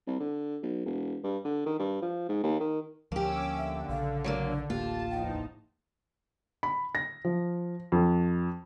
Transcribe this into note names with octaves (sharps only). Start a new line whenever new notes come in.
C2
D3
B1
E1
G2
D3
D#3
G2
F3
G#2
D#2
D#3
D2 F3 A#3 C#4 G4 D6 E6
D3 E5
A#1 C#3 F5
F#3 G#3 A#3 D4
D1 A1 A#3 F4 G4 A5
E2 F3 D#4 G5
B5
A#6
F3
F2